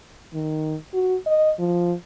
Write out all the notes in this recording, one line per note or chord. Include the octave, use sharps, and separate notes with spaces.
D#3
F#4
D#5
F3